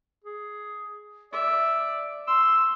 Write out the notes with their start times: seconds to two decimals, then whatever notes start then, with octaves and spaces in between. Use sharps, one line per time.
0.24 G#4
1.33 D5 E5
2.27 C6 E6